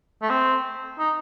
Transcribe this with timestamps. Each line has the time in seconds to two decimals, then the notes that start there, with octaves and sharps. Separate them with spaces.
0.22 A3
0.30 C4
0.99 D#4